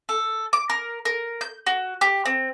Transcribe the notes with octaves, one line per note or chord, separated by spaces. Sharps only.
A4
D6
A#4
A#4
G6
F#4
G4
C4